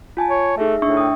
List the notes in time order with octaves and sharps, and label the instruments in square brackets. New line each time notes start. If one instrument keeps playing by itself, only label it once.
[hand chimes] F4 G#5 A5
[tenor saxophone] C#5
[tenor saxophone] A3 [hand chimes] D#4 G#4 E5
[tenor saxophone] A2 [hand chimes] D4 E5 C#6
[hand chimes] G5 D#6